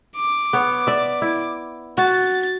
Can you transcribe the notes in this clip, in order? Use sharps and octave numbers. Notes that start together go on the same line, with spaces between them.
D6
B3 C#5
D5 E5
E4
F#4 A6